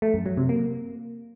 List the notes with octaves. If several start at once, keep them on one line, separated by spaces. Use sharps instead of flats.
A3
F#2
F#3
C3
A#3